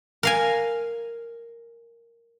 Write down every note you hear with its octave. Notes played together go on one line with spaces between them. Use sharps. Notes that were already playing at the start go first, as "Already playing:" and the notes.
A#4 F5 G#5